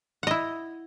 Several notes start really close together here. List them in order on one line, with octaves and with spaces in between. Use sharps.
F#5 D#5 E4